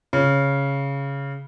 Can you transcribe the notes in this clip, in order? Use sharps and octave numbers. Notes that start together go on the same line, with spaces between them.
C#3